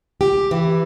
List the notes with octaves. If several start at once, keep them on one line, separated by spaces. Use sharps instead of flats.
G4
E3